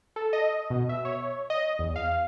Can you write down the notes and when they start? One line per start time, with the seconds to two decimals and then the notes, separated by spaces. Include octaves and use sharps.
0.16 A4
0.33 D#5
0.70 B2
0.89 E5
1.05 C#5
1.50 D#5
1.79 E2
1.96 F5